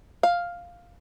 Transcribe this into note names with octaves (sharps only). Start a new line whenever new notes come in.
F5